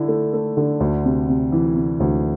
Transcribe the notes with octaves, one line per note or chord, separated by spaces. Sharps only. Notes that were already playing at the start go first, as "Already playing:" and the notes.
Already playing: D3 E4
A3
A3
D3
D2
C3
C3
E3
C3
D2